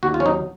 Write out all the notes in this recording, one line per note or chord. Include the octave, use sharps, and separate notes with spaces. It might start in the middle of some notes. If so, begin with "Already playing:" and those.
D#2 F#4
F4
C#4
F#3 D#4